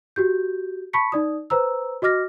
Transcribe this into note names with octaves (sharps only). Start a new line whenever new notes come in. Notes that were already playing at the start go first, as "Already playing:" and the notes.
F#4 G4 G6
A5 B5 C#6 B6 C#7
D#4 D5 D#6
B4 C5 A#5 E6
F#4 D#5 D6 F6 A#6